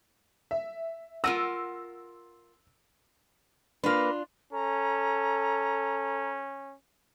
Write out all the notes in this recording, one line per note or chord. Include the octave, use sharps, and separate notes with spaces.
E5
F4 A#4 F#5 E6 A#6 D#7
A#3 D4 F4 B4
C#4 A4 A#5